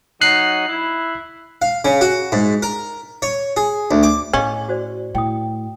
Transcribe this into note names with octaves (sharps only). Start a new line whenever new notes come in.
F#3 D#4 F#6 C7
E4
F5
C#3
F#4
G#2
A#4
C#5
G#4
D2
D6
A2 C#4 G#4 D#5 F5
F#4 C5 D5
A2 G5 D#6